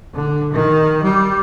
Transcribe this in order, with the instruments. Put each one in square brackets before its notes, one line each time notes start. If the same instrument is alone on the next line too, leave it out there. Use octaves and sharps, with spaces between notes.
[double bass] D3
D#3
G3